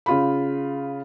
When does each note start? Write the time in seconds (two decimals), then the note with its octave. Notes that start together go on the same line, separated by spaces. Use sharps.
0.06 C#3 F4 B5